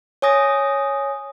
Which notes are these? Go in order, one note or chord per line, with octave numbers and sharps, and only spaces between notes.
C#5 G#5 D#6 A#6